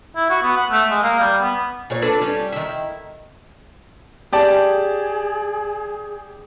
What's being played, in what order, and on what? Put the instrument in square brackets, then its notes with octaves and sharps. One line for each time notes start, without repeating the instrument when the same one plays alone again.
[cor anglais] E4
F#4
B3
F#5
A3
G#3
A#3
G3
B3
[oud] A#2 C#5
D4 A4 B4
G3 C#4
D#3 E4
[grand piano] G4 D5 A5 [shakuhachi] G#4